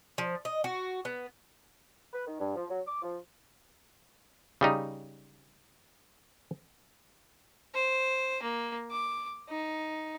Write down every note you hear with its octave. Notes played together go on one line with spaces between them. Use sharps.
F3
D#5
F#4
B3
B4
D#3
G2
F3
F#3
D6
F3
C#3 G3 D#4
C5
A#3
D6
D#4